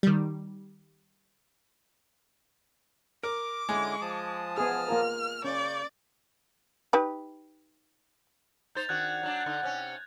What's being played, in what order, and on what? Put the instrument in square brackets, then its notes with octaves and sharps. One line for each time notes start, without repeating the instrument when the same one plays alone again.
[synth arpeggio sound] D#3 G3
[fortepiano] A#4 [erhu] D6
[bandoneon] D3 C#4 E4 [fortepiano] G#3
[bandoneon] F3 A5 D#6
[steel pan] B3 G#4 [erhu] F6
[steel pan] A#3 F4 A#4
[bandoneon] C#3 C#6 G6 [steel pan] C#4 [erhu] D5
[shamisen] D#4 G4 B4
[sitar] D#4 C5 [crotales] G6 A6 F7
[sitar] D#3 D4 F#4 [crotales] F#6 G#6
[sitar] F#3 D4
D3 D#4
C3 C#4